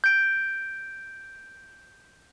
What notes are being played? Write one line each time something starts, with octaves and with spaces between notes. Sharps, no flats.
G6 D7